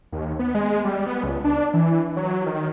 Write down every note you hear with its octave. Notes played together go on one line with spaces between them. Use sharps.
D#2
B3
G#3
G3
B3
C#2
D4
E3
F#3
D#3